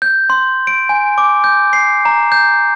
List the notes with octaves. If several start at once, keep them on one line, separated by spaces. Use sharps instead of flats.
G6
C6
D7
G#5
D6
G6
C7
A#5
G6